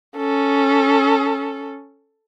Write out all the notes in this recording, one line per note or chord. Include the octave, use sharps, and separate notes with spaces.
C#4 A4